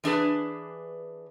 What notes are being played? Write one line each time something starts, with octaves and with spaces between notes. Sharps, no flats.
E3 D4 G#4 B4